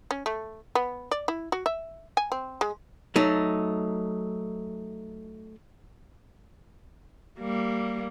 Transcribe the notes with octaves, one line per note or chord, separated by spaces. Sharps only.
C#4
A3
B3
D5
E4
F#4
E5
G#5
C4
G#3
F#3 A3 D#4
G3 A#3